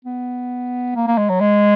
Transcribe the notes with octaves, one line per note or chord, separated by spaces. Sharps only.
B3
A#3
A#3
G#3
F#3
G#3